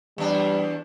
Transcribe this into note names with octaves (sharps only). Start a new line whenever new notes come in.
E2 G3 D4